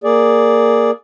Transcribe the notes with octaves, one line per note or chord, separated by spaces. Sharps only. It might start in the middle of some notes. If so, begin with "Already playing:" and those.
A#3 G#4 D5